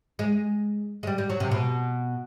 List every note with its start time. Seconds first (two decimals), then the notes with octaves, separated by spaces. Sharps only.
0.19 G#3
1.03 G#3
1.07 G3
1.18 G3
1.30 F#3
1.40 C3
1.51 B2